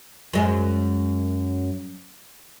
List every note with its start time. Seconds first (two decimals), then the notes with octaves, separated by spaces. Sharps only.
0.33 F#2 G#3